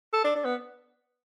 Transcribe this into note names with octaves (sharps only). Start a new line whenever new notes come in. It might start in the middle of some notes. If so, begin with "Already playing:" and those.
A4
D4
D4
B3